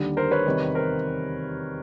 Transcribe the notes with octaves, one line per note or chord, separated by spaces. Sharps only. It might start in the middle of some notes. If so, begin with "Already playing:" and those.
Already playing: D#2 D3 G3
A#4 C5
B4 C#5
E2 C3 D#3 G3
A#4 C5